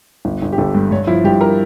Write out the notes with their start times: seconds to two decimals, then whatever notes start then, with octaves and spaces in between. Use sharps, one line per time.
0.25 G1
0.42 G1
0.52 G4
0.58 G1 A4
0.75 G2
0.91 G2 C#5
1.07 F3 E4
1.24 G2 G4
1.41 A#4